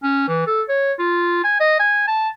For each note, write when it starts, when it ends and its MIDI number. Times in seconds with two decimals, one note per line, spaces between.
0.03 0.26 61
0.28 0.45 52
0.47 0.62 69
0.69 0.92 73
0.99 1.39 65
1.44 1.58 80
1.60 1.79 75
1.79 2.07 80
2.07 2.29 81